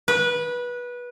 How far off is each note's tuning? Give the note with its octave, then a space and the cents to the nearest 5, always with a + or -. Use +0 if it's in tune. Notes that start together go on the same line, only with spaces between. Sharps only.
B4 -20